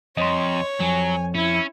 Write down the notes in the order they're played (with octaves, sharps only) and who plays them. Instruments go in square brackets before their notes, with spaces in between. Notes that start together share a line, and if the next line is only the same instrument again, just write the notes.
[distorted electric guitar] F2 [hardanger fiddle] C#5 [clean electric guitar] D#5 C6
[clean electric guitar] F2 [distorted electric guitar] F#3 [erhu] G#5
[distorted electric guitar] C#4 [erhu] E4